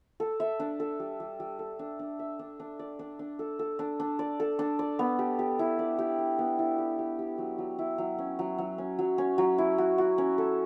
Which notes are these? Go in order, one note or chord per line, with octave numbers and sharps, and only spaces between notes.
A4
E5
D4
A4
G3
G3
G3
A4
D4
D4
E5
D4
D4
D5
D4
D4
A4
A4
D4
D4
D5
A4
D4
D5
B3
G4
G4
E4
D5
G4
D5
B3
E4
G4
G4
G4
F#3
F#3
E4
F#3
C#4
F#3
F#3
C#4
F#3
C#4
F#3
E4
F#4
F#4
C#4
A4